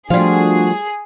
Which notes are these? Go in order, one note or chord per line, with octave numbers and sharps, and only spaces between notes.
F3 G3 A3 D4 F4 F#4 G#4